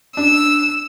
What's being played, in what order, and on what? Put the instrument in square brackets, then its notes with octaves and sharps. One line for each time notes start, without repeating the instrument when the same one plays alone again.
[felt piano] D4 [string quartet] E6